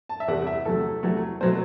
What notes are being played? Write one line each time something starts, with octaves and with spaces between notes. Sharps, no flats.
A5
E5
E2 C3 G3 F#5
E5
E2 C3 F#3 A3 A4
E2 C3 F#3 A3
B2 F#3 A3 C5